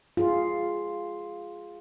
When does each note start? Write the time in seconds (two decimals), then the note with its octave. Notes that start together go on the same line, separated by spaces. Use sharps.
0.17 F4 G#4